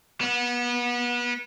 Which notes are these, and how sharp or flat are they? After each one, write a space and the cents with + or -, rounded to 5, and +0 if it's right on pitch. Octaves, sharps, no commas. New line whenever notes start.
B3 -30